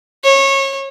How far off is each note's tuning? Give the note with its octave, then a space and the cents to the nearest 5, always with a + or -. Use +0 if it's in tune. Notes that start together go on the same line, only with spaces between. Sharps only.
C#5 -25